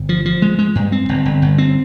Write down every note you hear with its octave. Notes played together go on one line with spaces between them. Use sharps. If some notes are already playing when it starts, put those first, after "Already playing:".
Already playing: G1
F3
F3
G#3
G#3
G2
C4
G1
G1
G1
C4